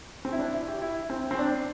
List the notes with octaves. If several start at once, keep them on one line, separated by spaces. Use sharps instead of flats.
C4
E4
D4
E4
G4
E4
C4
C4
D4